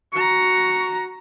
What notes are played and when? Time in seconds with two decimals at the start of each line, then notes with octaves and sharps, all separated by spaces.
0.13 F#4 A#5 C#6